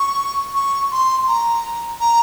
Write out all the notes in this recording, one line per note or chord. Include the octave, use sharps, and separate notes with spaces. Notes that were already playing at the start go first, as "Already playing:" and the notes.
Already playing: C#6
C#6
C6
A#5
A#5